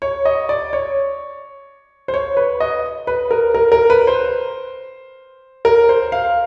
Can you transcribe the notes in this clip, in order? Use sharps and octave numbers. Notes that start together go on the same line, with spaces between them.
C#5
D#5
D5
C#5
C5
C#5
B4
D#5
B4
A#4
A#4
A#4
B4
C5
A#4
C5
F5